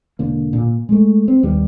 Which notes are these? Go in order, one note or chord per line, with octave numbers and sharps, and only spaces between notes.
E1 D3 A#3
A#2
G#3 A3
C4
D#2 G3 B3